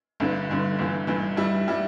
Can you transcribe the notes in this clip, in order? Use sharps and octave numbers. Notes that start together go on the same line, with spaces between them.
G1 G2 D3
G1 G2 D3
G1 G2 E3
G1 G2 E3
G2 G3 E4
G3 E4